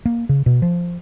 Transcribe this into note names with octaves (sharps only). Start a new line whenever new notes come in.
A#3
C#3
B2
F3